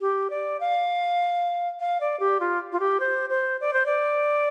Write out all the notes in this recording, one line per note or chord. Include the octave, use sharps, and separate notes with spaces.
G4
D5
F5
F5
D5
G4
F4
F4
G4
C5
C5
D5
C5
D5